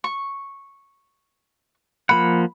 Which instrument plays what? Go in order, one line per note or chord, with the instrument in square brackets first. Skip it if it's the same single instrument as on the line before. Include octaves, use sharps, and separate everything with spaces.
[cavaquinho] C#6
[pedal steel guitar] F3 A#3 F#5 [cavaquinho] B5